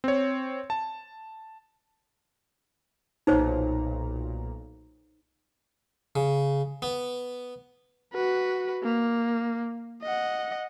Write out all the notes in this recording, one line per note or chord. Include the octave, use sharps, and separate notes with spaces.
C4 C#5
A5
B1 A#2 D#4 C5 C#5 A#5
C#3
B3
F#4 B4
A#3
D#5 F#5